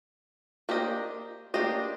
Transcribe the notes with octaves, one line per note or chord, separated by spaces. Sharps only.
A#3 D4 G4 C5 D#5
A#3 D4 G4 C5 D#5